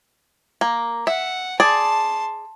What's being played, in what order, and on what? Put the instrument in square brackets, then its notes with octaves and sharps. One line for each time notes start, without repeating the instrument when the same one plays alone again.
[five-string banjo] A#3
[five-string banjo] E5 [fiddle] F#5
[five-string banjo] G#4 D5 [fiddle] A5 C6